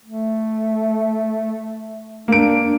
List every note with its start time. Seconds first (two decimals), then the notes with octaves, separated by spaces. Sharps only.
0.05 A3
2.28 A#3 D4 D7